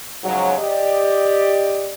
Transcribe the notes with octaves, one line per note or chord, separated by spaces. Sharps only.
G#2 C#3 F3 F#3
G4 D5 D#5